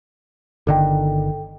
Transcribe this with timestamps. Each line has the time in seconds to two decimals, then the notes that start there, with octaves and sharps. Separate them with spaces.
0.67 G1 D3 D#3 A4 G5